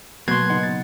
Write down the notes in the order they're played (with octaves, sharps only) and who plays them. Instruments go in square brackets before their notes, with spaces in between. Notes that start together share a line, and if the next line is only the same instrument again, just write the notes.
[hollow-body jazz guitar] B2 [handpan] F#3 A#3 [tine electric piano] C6 C7 [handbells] F#6 G#6
[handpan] C#3 D#4 D#5 [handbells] F#5
[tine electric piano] A6